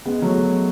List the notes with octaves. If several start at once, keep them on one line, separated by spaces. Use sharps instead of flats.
G#3 B3
F#3 A3